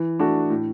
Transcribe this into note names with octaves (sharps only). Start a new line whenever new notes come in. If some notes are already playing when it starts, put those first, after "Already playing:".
Already playing: E3
A3 D4 F#4
A2